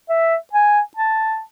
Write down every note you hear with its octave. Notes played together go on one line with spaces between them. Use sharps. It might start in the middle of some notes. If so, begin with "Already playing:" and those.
E5
G#5
A5